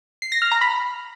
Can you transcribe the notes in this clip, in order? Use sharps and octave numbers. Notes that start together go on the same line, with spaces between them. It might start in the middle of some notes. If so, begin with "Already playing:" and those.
C7
A#6
F6
A#5
B5